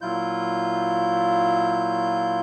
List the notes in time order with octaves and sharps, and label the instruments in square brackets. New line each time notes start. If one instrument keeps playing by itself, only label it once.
[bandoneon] A#2 F#3 E4 F4 G6